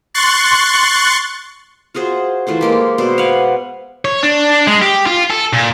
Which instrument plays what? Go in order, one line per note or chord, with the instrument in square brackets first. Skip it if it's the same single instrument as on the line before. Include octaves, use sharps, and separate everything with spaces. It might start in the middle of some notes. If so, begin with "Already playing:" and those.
[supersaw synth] C6 C#6 F#6 A6
[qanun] F4 F#4 G#4 C5
E3 A3 F4 C5
G#3 A#3 G4
B2 C5 D5
F5 F#5 G#5
[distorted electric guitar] C#5
D4
G#3
G4
F4
A4
A#2